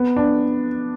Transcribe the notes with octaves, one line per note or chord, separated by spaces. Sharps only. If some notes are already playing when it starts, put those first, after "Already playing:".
Already playing: B3
D4